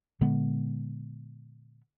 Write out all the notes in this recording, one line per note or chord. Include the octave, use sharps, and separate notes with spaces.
A#2 D3 G#3 B3